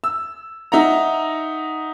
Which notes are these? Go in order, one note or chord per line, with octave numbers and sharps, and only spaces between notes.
E6
D#4 E5 F#5 A#5